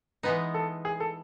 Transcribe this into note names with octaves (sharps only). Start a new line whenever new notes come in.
E3 G#3 B3 D#4 B4
A4
G#4
A4